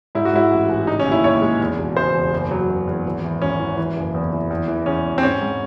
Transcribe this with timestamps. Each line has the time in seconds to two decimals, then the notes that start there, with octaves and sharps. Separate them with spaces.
0.15 G#2 E4
0.25 F#4
0.33 G#2 E4
0.51 A1
0.70 A1
0.87 C#3 D#4
1.00 C#4
1.06 D#2
1.12 E4
1.24 D#2 C#5
1.42 G#3
1.60 E2
1.78 E1
1.97 C#3 C5
2.14 E2
2.33 F#1
2.51 F#3
2.68 F#1
2.87 E2
3.05 G#1
3.23 E3
3.42 G#1 C#4
3.60 E3
3.77 E3
3.96 F#1
4.14 E2
4.33 E3
4.50 E2
4.68 E3
4.86 E2 C#4
5.05 E1
5.18 C4
5.23 G#2 C#4
5.41 G#2